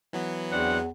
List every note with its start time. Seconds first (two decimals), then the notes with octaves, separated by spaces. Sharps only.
0.13 E3 F#3 B3
0.53 E2 C4 D4 F#5